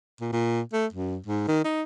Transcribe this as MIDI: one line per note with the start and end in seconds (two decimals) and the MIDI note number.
0.21 0.32 46
0.32 0.61 46
0.73 0.86 57
0.93 1.18 42
1.26 1.46 44
1.48 1.62 51
1.65 1.83 63